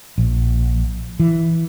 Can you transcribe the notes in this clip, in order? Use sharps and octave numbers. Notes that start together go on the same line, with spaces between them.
A#1
E3